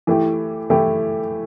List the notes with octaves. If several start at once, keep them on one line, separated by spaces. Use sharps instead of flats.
E3 A3 E4 G4
E3 A3 E4 G4